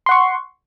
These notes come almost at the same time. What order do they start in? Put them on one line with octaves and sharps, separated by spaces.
C6 F#5 C#6